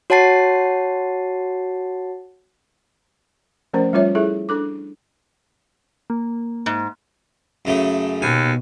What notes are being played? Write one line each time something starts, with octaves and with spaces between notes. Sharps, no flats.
F#4 C#5 F#5 A5 A6 C7
F3 A3 C#4 A#4 C5
G3 C#4 F4 C#5 E5
E4 G#4 A4 E5
D4 A4 D6
A#3
G#2
F#2 C#3 A3
D#2 B2 G#5